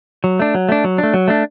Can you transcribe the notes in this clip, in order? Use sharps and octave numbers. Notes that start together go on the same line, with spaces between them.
F#3
A3 D4
F#3
A3 D4
F#3
A3 D4
F#3
A3 D4